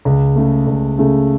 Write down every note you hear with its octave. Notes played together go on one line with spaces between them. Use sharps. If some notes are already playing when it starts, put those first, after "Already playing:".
C#2
C#3 A3
C#2
C#3 A3